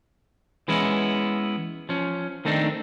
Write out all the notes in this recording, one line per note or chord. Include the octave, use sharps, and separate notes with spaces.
E3 G#3 B3 C#4 E4
F3 C#4
D#3 A3 C4 D4 D#4